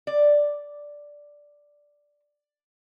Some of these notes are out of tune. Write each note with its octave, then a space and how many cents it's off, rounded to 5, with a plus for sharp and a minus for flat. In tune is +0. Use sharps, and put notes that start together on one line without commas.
D5 -5